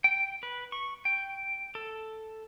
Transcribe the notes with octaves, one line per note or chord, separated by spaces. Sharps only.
G5
B4
C#6
G5
A4